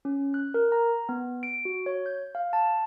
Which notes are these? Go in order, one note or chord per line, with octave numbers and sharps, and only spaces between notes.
C#4
F#6
A#4
A#5
B3
D7
F#4
C#5
G6
F5
A5